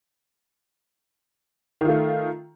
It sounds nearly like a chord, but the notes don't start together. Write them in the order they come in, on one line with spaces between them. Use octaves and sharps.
D#3 F4 A3